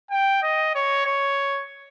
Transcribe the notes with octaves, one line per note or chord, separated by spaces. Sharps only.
G5
D#5
C#5
C#5